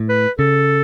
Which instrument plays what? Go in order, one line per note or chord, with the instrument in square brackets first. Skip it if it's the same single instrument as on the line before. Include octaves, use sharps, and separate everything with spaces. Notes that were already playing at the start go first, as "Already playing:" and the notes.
Already playing: [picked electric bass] A2
[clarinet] B4
[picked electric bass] C#3 [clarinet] A4